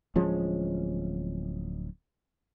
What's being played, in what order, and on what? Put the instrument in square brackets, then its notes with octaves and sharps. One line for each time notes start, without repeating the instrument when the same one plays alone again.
[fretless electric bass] D1 F3 G#3 C#4